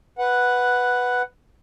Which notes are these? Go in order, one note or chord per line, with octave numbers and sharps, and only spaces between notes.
B4 F#5